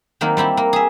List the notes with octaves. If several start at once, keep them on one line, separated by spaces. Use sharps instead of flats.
D#3 F#3 A#3 C4
G3 C4 E4 G4
A#3
G#4 E5